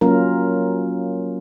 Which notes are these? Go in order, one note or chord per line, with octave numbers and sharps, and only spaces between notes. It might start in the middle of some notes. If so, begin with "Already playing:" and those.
F#3 A#3 C#4 F4 A#4